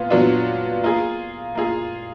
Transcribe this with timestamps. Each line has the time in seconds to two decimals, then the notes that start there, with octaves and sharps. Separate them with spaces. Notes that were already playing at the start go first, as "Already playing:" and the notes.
Already playing: A#2 B3 F4
0.10 A#2 F#3 B3 D4 F4
0.83 A#3 F4 G#4
1.55 A#3 F4 G#4